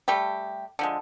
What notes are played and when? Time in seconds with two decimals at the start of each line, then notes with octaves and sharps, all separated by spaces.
0.08 G3 A3 G4
0.79 D3 F3 G#3